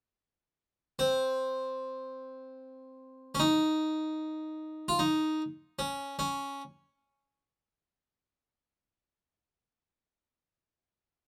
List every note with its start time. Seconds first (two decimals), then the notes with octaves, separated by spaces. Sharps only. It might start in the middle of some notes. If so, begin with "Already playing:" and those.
0.99 C4
3.35 C#4
3.39 D#4
4.88 F4
4.99 D#4
5.79 C#4
6.19 C#4